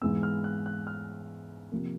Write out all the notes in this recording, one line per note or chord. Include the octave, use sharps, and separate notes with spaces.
G#2 E3 G#3 B3 E6
F6
F#6
F#6
F6
C3 F3 A#3